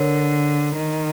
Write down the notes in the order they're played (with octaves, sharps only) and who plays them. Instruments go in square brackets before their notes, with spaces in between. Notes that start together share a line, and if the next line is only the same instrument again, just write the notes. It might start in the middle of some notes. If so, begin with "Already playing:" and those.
Already playing: [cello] D3 [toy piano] A#4 C#5
[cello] D#3